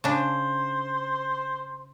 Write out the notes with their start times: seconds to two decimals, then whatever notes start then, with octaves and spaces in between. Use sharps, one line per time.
0.04 C#3 D4 C5